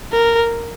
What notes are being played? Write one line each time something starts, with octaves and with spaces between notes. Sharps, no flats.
A#4